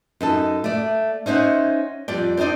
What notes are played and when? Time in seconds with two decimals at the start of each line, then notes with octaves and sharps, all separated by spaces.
0.21 F#2 D#4 A4
0.64 A3 D5
1.26 C#4 D#4 C5 E5 F#5
2.08 F2 G3 D5 G5
2.37 C4 D4 D#4 D5 D#5